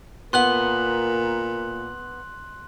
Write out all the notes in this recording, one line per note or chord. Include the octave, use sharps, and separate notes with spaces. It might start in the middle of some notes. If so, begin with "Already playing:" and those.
A#2 B3 A#4 F#5 C6 F#6 F#7